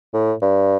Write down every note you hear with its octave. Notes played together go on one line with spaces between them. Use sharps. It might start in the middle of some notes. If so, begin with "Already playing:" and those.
A2
G2